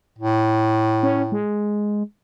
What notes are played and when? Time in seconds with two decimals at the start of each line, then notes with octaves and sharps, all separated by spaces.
0.19 A2
1.03 C#4
1.32 G#3